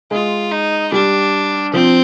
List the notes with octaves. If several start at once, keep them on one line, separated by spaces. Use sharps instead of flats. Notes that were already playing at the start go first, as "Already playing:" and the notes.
G#3 F4
D#4
G3 D4
F3 C4